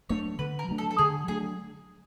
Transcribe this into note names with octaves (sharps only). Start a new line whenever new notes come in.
F#3 A3 D4 C#5
D3 B4
A#4
F#3 A3 D4
A4
A4
D3 G#4
F#3 A3 D4 G#4